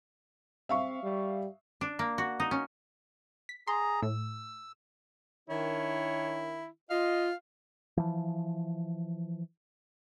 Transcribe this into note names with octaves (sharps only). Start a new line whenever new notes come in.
C4 E5 F5 C#6
G3
D4
A#3
F#4
D#4
C#4
B6
G#4 A#5 C6
A2 E6
D#3 D4 E4 C#5
F4 D#5 F5
E3 F3